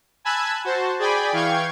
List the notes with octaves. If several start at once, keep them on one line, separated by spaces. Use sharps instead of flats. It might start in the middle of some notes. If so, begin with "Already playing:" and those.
G#5 A5 B5 E6 F#6 G#6
F#4 C5 A5
G#4 D5 G5 G#5 B5
E3 F5 G5 C#6 G#6